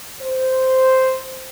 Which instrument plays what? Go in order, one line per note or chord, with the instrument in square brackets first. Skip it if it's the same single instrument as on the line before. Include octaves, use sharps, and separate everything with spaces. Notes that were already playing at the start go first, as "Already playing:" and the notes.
[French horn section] C5